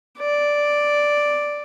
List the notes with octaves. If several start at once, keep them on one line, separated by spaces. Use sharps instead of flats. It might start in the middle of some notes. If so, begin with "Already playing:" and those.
D5